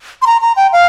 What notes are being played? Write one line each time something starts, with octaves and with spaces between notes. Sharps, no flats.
C6
A#5
A#5
G5
F5